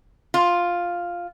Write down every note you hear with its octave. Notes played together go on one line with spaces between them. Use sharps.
F4